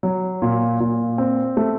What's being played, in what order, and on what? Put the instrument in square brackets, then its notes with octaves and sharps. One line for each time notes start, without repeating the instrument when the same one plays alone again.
[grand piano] F#3
A#2
A#2
C4
A3